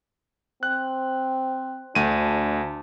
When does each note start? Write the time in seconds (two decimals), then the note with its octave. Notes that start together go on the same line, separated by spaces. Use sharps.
0.63 C4 F#6
1.95 D2 D4 D#7